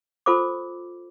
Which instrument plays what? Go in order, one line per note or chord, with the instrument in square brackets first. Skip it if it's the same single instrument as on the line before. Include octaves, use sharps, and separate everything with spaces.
[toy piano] F4 A4 C5 D6